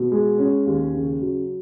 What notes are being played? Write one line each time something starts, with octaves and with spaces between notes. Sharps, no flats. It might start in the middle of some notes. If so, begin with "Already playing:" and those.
Already playing: B2
G#3
C#4
D#2
C#3
F#3